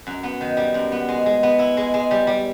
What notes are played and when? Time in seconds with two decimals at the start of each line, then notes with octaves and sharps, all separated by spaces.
0.07 F#2
0.23 B3
0.41 D#3
0.57 G3
0.74 F#2
0.92 B3
1.09 G#3
1.26 G#3
1.43 B3
1.59 E4
1.77 G#3
1.94 G#3
2.11 G3
2.27 G3